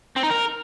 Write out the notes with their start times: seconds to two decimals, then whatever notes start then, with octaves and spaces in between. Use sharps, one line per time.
0.16 C4
0.23 D#4
0.30 A#4